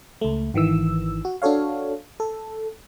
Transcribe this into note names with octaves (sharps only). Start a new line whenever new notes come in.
C#2 A3
G#1 D#3 E3 E6
F#4
D4 F#4 A4 C#5 F5
A4